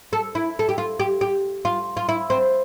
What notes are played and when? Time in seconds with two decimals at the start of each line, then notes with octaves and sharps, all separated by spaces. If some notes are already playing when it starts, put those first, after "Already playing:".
0.13 A4
0.35 E4
0.59 A4
0.69 G4
0.78 F4
1.00 G4
1.21 G4
1.65 F4
1.97 F4
2.09 E4
2.30 C4